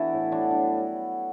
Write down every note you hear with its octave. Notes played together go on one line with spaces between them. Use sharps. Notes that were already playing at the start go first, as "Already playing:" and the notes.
Already playing: E3 B3 D4 E4 F#4 A4
A2
G3 D4 F#4
F#3 D4